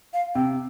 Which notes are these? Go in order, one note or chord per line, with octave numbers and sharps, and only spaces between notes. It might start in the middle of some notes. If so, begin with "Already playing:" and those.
F5
C3 G5